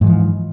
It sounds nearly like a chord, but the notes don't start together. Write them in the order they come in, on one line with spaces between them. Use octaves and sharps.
G#2 E3 F3